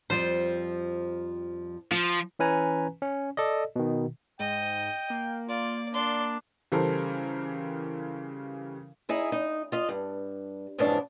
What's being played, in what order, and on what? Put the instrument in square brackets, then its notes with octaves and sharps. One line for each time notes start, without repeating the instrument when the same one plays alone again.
[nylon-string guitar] F2 F3 G3 [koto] C5
[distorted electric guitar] F3 [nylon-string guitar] F4
[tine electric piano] E3 C#4 B4 G#5 A#5
C#4
A4 D5 D#5
B2 D#3
[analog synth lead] G#2 [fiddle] D#5 [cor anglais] G5
[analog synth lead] A#3
[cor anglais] F4 [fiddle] D5
[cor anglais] D4 [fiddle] D5 C6
[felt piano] C#3 E3 G3 A4 A#4 C5
[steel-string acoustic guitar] D#4 E4 G#4
D#4
F4 D#5
G2
F2 G#2 C#3 E3 D4